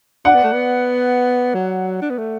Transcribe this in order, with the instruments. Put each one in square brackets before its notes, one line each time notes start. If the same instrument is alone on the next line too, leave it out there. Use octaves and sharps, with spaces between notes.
[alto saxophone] D4 [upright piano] D5 F#5
[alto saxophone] B3
A3
B3
F#3
D4
B3
A3